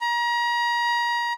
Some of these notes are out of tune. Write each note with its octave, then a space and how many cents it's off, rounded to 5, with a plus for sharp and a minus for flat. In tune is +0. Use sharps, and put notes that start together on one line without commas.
A#5 +35